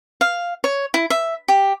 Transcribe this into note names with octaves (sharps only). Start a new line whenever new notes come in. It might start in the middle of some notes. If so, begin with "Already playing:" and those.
F5
C#5
E4
E5
G4